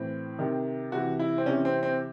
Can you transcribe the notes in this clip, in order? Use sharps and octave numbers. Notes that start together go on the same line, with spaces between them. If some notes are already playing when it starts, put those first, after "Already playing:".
Already playing: A2 E3 C4
C3 D#3
C3 E3 F#4
E4
C4
C3 E3 C#4
C4
C4